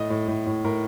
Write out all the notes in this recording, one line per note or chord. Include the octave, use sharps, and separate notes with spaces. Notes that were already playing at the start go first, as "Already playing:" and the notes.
Already playing: A2 D#5
A2
A2
A2
A2 A#4